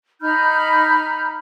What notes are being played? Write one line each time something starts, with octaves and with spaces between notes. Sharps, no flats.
D#4 B5 F6 G6